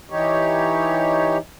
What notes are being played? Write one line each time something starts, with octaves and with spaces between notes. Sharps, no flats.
E3 D#4 G4 C#5